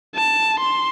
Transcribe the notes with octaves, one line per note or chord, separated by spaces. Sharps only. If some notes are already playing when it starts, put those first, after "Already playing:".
A5
C6